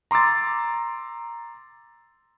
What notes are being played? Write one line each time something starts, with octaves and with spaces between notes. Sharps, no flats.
A#5 C6 D6 E6 A6